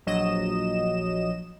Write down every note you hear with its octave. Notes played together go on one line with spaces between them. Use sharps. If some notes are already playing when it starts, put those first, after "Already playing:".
A#1 F#3 D#5 E7